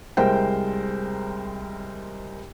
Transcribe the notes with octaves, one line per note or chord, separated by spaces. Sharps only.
C2 G#3 A#4 C5 G5